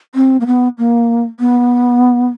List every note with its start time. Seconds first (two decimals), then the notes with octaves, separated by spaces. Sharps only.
0.15 C4
0.40 A#3
0.46 B3
0.78 A#3
1.40 B3